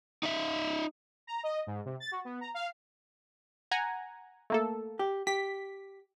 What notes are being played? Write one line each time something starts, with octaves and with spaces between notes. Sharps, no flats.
D#4 E5
A#5
D#5
G#2
C3
A6
F#4
B3
A#5
F5
F#5 G#5 A#5
A3 A#3 A4
G4
G4 B6